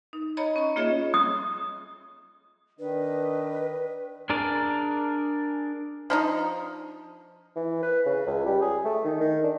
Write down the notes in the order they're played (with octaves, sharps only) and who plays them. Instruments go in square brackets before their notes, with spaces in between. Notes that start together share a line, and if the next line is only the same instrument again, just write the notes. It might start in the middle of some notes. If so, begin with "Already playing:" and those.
[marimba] D#4
C#5 D#5 A#5 B5
C#4 C#6
A#3 F4 G#4 C#5 D#5 E5
[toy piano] D#6
[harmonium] D#3 [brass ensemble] D4 D#5 [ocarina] B4
[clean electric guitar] D4 G#4 A#4 D5
[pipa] F3 D4 D#4
[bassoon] E3
B4
C#3
C#2
G3
G#4
A3
D#3
D#3
D4